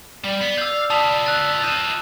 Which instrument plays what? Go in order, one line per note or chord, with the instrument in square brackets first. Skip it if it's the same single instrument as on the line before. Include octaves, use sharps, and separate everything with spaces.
[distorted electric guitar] G3 [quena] D5
[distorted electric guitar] B3 [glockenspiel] C7
[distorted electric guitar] F5 [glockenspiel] E6 G6
[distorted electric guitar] F4 B4 [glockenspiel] A5 D#6 F7
[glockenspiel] E6 F#6 A6
[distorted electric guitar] F4 D#5 [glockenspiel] G6 E7